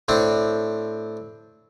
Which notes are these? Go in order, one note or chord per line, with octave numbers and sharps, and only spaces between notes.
A2 C4 D4